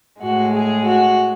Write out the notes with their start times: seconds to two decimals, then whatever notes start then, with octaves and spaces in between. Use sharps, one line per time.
0.21 A2 G#3 F#4
0.54 G#4
0.86 F#4